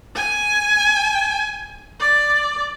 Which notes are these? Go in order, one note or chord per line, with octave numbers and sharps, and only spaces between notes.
G#5
D5